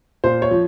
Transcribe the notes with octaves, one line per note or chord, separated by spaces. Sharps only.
A#2 C5
C#5
F3